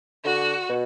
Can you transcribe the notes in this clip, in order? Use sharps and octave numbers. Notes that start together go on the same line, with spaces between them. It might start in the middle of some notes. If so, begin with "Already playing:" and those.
D3 F#4
B2